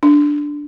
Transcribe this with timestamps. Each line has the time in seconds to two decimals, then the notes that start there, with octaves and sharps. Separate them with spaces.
0.03 D4